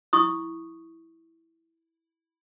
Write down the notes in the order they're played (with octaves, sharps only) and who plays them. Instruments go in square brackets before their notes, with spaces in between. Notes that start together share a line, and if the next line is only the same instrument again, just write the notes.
[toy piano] E4 C#6 D#6